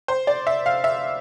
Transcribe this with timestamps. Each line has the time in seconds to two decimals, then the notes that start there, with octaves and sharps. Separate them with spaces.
0.08 C5
0.27 D5
0.47 E5
0.66 F5
0.84 E5